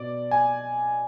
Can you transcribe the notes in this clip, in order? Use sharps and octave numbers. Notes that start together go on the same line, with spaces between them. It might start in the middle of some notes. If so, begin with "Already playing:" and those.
Already playing: B2 D5
G#5